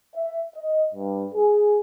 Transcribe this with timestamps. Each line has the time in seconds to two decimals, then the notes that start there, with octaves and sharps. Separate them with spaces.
0.15 E5
0.56 D#5
0.93 G2
1.34 G#4